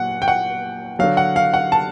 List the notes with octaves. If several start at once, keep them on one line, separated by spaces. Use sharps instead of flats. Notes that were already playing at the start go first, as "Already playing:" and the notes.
Already playing: A#2 F#3 F#5
G5
F#5
D3 F#3 F5
F#5
F5
F#5
A5